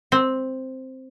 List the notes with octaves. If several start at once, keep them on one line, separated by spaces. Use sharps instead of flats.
C4